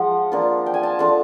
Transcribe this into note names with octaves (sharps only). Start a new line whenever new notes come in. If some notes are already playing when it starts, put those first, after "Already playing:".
Already playing: F3 G#3 F#5
A#3 D4 F4
G5
G#5
A5
A3 D4 F4 A5